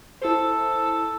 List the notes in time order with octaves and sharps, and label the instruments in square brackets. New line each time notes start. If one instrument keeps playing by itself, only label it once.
[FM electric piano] E4 C5 [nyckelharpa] A4